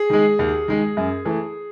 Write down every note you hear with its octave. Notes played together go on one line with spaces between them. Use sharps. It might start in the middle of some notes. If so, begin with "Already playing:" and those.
Already playing: G#4
D#3 G#3
D#2
D#3 G#3
F#2
E3 A3